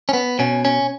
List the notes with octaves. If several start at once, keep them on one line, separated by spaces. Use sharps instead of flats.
C#4
B3
B2 C#4
C#4